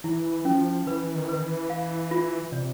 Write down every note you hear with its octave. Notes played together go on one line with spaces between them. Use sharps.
E3 E4
F3 C#4
E3 B4
D#3
E3
D#3 B4
E3
F5
F4
C3 D5